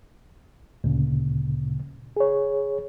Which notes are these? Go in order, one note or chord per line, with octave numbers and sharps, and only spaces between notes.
D2 A#2 C#3
G#4 C#5